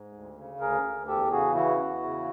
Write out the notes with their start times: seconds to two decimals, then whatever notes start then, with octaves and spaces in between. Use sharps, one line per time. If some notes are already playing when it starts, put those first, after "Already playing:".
Already playing: G#2
0.13 D2
0.37 C#3
0.60 D2 G#4 A#4
0.84 D2
1.07 E2 G4 A4
1.31 C#3 F#4 G#4
1.54 E3 E4 F#4
1.78 E2
2.02 C#3